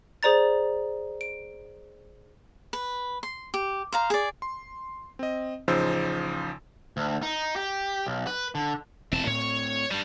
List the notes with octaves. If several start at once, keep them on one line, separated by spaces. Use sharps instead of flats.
G#4 C5 D5 A#5 A6
D7
B4
C6
G4
C5 F5 A#5
G#4 D5
C6
C4 D#5
A1 C#3 F3 D#4 C5 E6
D2
D#4
G4
B1
B4
D3
E1 E3 C4 A5
A2 C4 C#5
G2 G3